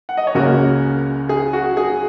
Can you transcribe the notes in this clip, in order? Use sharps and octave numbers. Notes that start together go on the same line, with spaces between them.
F#5
D#5
C#5
C#2 C#3 A#3 C#4 F#4 A#4
G#4
F#4
G#4